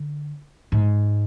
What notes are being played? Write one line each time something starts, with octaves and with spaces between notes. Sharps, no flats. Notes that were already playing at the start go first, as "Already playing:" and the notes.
Already playing: D3
G#2